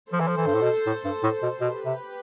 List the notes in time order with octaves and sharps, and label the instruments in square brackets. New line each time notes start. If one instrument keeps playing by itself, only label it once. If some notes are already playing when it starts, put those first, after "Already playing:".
[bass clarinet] F3 [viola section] A4 C5
[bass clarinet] E3
F3
E3
G2
A2
B2
A2
G2
A2
B2
[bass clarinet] B2 [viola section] G4 B4
[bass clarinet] C3